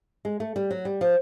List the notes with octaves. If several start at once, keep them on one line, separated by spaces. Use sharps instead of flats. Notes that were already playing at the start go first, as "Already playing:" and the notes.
G#3
A3
G3
F#3
G3
F3